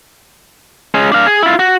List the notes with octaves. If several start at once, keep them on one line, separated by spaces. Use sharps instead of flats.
G#3 C#4
D4 F5
G#4
E4 F4
F#4